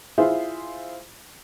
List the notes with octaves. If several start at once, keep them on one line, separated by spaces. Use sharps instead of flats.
E4 F4 G#4 C5 E5